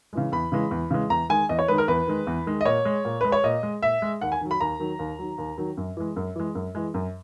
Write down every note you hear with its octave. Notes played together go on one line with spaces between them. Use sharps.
C#3 E3 G#3
E2 B5
C#3 E3 G#3
E2
C#3 E3 G#3
E2 A#5
D#3 G#3 G#5
E2 D#5
C#5
D#3 G#3 B4
A#4
E2 B4
D#3 G#3
E2
D#3 G#3
D#5
A#2 C#5
G#3
A#2
G#3 B4
C#5
A#2 D#5
G#3
A#2 E5
G#3
D#2 F#5
G#5
D#3 F#3
B5
D#2 A#5
D#3 F#3
D#2
D#3 F#3
D#2
D#3 F#3
F#2
E3 G#3
F#2
E3 G#3
F#2
E3 G#3
F#2